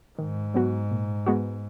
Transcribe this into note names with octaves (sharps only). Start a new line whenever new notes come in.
G#2 D#3
F#3 B3 F#4
A#2
G#3 B3 F#4